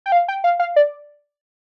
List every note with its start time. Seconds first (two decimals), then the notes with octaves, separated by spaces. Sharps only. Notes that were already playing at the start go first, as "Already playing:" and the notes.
0.06 G5
0.12 F5
0.28 G5
0.44 F5
0.60 F5
0.76 D5